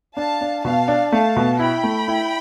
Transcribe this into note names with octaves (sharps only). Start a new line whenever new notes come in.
D4 F5 A5
D4
B2 F5 A5
D4
A3 F5 A5
B2
E4 G5 B5
A3
E4